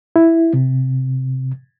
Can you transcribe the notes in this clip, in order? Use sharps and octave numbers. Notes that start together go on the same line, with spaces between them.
E4
C3